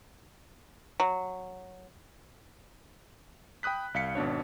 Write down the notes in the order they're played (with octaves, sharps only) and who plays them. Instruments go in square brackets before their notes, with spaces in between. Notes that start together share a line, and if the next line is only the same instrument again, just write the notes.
[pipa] F#3
[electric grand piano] G5 B5 D#6 F#6 B6
C2 F5 B6 C#7
G#1 B2 D4 C#5